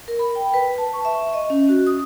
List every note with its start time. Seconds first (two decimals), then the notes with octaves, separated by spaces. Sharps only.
0.08 A#4
0.19 B5
0.35 G5
0.54 B4
0.78 A5
0.93 C#6
1.05 E5
1.34 D#5
1.50 C#4
1.69 F#4
1.87 D#6